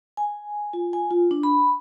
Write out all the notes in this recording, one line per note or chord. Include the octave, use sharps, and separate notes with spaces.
G#5
F4
G#5
F4
D4
B5